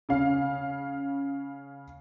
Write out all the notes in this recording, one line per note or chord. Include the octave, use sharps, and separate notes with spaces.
C#3 C#4 F5